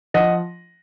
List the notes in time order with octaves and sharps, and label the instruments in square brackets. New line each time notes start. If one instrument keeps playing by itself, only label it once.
[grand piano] F3 D#5 F#5